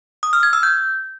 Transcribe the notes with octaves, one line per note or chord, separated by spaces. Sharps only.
D#6
F6
G#6
E6
G6